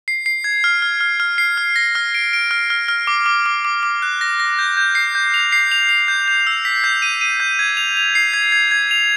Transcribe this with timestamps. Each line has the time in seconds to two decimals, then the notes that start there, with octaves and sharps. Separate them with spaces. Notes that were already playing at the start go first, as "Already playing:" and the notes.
0.08 C7
0.26 C7
0.44 G#6
0.64 F6
0.82 F6
1.01 F6
1.20 F6
1.38 C7
1.57 F6
1.76 A#6
1.95 F6
2.14 D7
2.33 D7
2.51 F6
2.70 F6
2.88 F6
3.07 D6
3.26 D6
3.46 D6
3.65 D6
3.83 D6
4.02 F#6
4.21 A#6
4.40 A#6
4.59 G6
4.77 G6
4.95 C7
5.15 G6
5.34 F7
5.52 C7
5.72 F7
5.89 F7
6.08 G6
6.28 G6
6.47 E6
6.65 B6
6.84 G6
7.02 D#7
7.21 D#7
7.40 G6
7.59 G#6
7.77 F7
7.97 F7
8.15 C7
8.34 G#6
8.52 G#6
8.71 G#6
8.91 F7